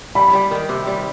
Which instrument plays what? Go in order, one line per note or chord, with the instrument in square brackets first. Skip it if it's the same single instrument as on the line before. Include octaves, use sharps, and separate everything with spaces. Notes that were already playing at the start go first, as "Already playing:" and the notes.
[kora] G3 [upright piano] B5
[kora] G3
D#3
C3
G3